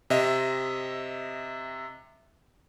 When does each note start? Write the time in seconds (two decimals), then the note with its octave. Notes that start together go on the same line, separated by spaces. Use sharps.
0.10 C3 D#5 E5